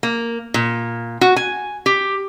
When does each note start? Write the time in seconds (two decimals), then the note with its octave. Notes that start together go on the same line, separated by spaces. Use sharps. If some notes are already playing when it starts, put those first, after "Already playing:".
0.03 A#3
0.54 A#2
1.21 F#4
1.36 G#5
1.86 G4